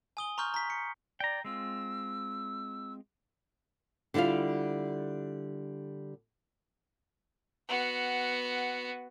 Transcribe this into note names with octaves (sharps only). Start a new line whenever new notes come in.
G#5 D#6 G7
A#5 C6 C#6 F6 G6
A#5 B6
C#7
D5 G5 A#5
G#3 C4 F4 E6
D3 G3 E4 F4 F5
B3 F#4